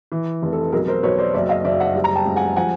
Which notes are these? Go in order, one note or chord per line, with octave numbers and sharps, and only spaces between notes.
E3
F1
A4
B1 G#4 A#4
A#4 C5
B1 B4 C#5
C5 D5
F#1 D5 E5
D#5 F5
F#1 D5 E5
E5 F#5
G3
A#5
G5 A5
C#2
F#5 G#5
F3 F#5 G#5